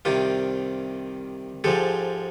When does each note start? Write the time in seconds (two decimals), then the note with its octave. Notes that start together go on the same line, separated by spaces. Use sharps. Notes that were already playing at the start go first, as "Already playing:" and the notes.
0.05 C2 C3 D#3 F4 G4
1.64 G#2 F3 G#3 G4 A4